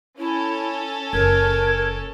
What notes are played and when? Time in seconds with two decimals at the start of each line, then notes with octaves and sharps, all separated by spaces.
0.18 C#4 E4 A4
1.13 F#1 A#4 G#6